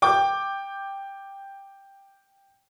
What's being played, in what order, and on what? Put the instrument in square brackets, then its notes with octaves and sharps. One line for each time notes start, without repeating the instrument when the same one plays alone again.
[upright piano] G5 D6